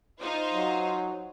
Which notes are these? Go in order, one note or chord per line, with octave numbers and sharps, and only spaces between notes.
D#4 F4 C5
F#3